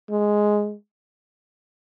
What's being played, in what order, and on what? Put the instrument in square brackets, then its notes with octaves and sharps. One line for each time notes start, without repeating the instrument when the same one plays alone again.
[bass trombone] G#3